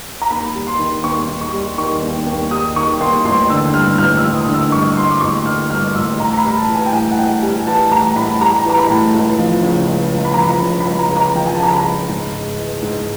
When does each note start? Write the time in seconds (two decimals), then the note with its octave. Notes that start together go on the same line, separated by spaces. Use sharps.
0.22 A#5
0.30 D#2 B5
0.55 G3
0.67 C6
0.79 D#3
1.04 D#2 C#6
1.28 D#2
1.41 C#6
1.54 G3
1.78 D#3 C#6
2.02 D#2
2.27 D#2
2.51 G3 D#6
2.76 D#3 C#6
3.00 D#2 C6
3.25 A1 C6
3.50 D3 E6
3.74 G2 F6
3.98 A1 F6
4.17 E6
4.23 A1
4.35 D#6
4.47 D3
4.54 E6
4.72 G2 C#6
4.97 A1 C6
5.11 D6
5.21 A1 C#6
5.46 D3 F6
5.70 G2 F6
5.95 A1 E6
6.19 A2 A#5
6.33 A#5
6.38 B5
6.45 G3
6.57 A5
6.68 E3
6.75 G#5
6.86 G5
6.93 A2 G#5
7.12 F#5
7.18 A2 G5
7.42 G3 G#5
7.67 E3 A5
7.91 A2 A#5
8.16 A2 B5
8.41 G3 A#5
8.65 E3 A#5
8.78 B5
8.90 A2
9.14 C#2
9.39 F3
9.63 C#3
9.88 C#2
10.13 C#2
10.25 B5
10.34 F3 A#5
10.44 B5
10.61 C#3
10.80 B5
10.86 C#2
10.99 A#5
11.11 C#2
11.17 A#5
11.35 F3 G5
11.46 G#5
11.54 A5
11.60 C#3 A#5
11.73 B5
11.84 C#2
12.09 G#2
12.33 G#3
12.58 E3
12.82 G#2